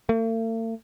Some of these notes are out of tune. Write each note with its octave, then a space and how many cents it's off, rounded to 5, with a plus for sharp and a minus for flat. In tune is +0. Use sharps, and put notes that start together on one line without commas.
A3 +45